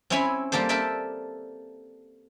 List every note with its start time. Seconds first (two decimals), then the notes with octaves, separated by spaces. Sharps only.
0.10 C4 C#4 E4 C#5 G#5 B5
0.52 G3 A#3 G4 A4 C5
0.69 A4 A#4 D5 E5 G5